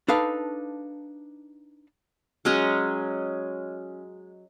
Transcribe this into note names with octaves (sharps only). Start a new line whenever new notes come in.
D4 D#4 A4 B4 F5
F#3 G#3 C#4 D#5